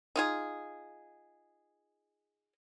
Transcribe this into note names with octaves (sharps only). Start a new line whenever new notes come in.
D#4 F4 G#4